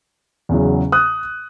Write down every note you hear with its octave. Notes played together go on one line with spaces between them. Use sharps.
E2 C#3 F#3
D#6 F#6